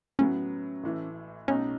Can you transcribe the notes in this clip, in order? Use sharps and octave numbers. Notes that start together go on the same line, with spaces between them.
A2 F#3 B3 C#4
A1 A2 E3 A3
B1 B2 A3 C#4 D#4